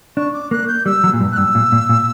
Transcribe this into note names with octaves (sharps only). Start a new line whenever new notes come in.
D4 C#6
D6
A#3 F#6
G6
G3 E6
F#3
A#2
G2
F#6
G2 E6
A#2
A#2
A#2